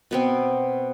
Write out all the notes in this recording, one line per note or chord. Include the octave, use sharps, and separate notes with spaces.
B2 B3 C4